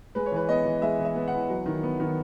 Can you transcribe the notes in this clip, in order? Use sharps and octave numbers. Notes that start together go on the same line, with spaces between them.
G#3 B4
C#5
E3 B4
B3 D#5
E3
G#3 E5
E3
E5
B3
E3 F#5
F#3
D#3
B3
D#3